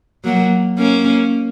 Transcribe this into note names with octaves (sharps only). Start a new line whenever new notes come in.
F#3 A#3
A#3 C#4